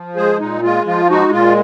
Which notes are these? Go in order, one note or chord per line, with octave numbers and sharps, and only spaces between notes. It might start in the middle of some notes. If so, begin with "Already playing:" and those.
Already playing: F3
G#3 G#4 C5
A#2 D#4
G#3 F4
F3 F4
G#3 D#4 F#4
A#2 F4